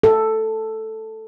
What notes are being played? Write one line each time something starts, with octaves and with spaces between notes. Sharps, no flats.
A4